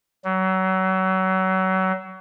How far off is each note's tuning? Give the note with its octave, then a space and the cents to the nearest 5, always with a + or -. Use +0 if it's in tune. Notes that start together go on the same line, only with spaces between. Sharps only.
F#3 +30